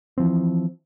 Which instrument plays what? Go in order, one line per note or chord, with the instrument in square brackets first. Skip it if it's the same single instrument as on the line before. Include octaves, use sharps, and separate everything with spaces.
[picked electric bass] E3 F3 C4